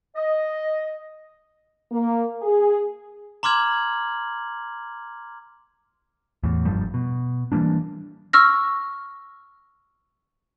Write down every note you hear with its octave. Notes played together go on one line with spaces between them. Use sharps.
D#5
A#3
G#4
A#5 C6 D6 F6 G#6 F#7
E2 A2
F1 G2 F3 G3
B2
E3 G3 A#3 D4
C#6 E6 F6 A#6